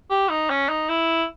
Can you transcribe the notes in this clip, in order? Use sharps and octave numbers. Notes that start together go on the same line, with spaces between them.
G4
D#4
C#4
D#4
E4